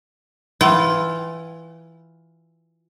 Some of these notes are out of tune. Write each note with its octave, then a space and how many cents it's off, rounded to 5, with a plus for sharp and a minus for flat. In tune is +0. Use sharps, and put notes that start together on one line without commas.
E3 +5 F4 +10 G5 -45